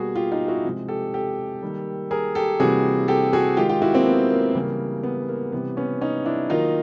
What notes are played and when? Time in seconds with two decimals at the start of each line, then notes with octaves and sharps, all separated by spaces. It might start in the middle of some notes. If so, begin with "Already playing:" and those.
Already playing: B2 G3 A#3 F#4 G#4
0.16 F4 G4
0.32 D#4 F4
0.48 E4 F#4
0.65 C3 F3 G#3
0.88 G4 A4
1.14 G4 A4
1.62 D#3 G3 A#3
2.11 G#4 A#4
2.35 G4 A4
2.60 C3 E3 G3 A#3 F#4 G#4
3.08 G4 A4
3.33 F#4 G#4
3.57 D#3 G#3 F4 G4
3.69 F4 G4
3.82 E4 F#4
3.93 A#3 C4
4.06 B3
4.30 A#3
4.55 C#3 E3 G3 A#3
5.04 B3
5.29 A#3
5.52 C3 E3 G3 B3
5.77 B3 C#4
6.01 C#4 D#4
6.26 D4 E4
6.50 D#3 F#3 A#3 D#4 F4